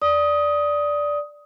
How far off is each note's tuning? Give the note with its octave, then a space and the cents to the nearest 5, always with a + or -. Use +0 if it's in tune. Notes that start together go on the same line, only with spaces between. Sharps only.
D5 -5 D#6 +15